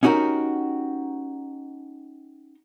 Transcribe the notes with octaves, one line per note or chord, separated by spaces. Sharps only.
C#4 D#4 F#4 G4 A#4